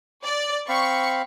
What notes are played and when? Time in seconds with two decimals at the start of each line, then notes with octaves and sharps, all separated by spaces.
0.24 D5
0.69 C4 F5 B5 C#6